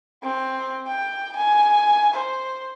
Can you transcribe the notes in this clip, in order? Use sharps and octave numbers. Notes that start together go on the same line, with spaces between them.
C4
G5
G#5
C5